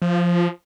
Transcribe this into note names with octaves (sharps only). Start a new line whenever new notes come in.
F3